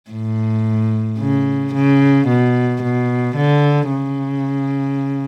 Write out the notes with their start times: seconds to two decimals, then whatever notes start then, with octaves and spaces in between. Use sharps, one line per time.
0.11 A2
1.19 C#3
1.74 C#3
2.28 B2
2.82 B2
3.36 D3
3.91 C#3